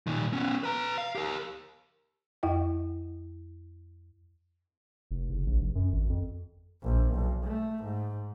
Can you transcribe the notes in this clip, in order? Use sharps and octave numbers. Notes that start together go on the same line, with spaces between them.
A#2 D#3
B3 C#4
B4 A#5
F5
G4 A#4
F2 E4 D#5 G5
F1
F#1
A#1
F1
F#2
G#1
F2
A#1
B1
A3
G#2